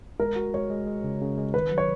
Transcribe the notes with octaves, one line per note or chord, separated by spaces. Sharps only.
G#3 A#4
F#4
G#3 C#5
G#3
G#3
C#3
C#3
G#3
D#3 B4
F#3
C#5